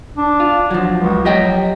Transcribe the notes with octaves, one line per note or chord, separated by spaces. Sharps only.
D4
F4
F3 F#3
C#2
F#3 G4 D#5 G5